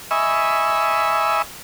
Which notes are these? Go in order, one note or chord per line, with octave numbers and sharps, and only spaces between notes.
D#5 E5 G#5 B5 C#6 E6